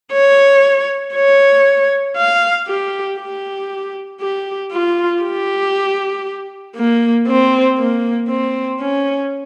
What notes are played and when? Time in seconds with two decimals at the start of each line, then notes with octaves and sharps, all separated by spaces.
0.12 C#5
1.15 C#5
2.17 F5
2.68 G4
3.18 G4
4.21 G4
4.72 F4
5.23 G4
6.76 A#3
7.28 C4
7.79 A#3
8.29 C4
8.80 C#4